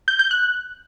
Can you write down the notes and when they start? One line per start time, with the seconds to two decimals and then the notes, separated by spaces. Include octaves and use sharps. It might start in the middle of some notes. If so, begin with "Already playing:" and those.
0.08 G6
0.19 G6
0.31 F#6